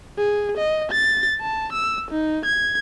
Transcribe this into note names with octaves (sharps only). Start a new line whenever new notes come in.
G#4
D#5
A6
A5
E6
D#4
G#6